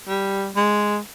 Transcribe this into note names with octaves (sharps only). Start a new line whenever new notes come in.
G3
G#3